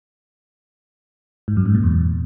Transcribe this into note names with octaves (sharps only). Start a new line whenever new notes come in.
G#2
F#2
G#2
A#2
E2